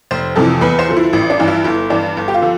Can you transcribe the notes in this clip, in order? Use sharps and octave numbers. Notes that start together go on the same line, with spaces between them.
F1 C5
F2 C3 E3 A4
E2 B4
C5
D3 F3
E4
A1 E4
D4
G2 E3
E4
G1 E4
G2 E3 D4
G1
G4
F4
D3 F3